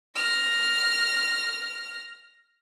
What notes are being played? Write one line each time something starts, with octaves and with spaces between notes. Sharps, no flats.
F6 A#6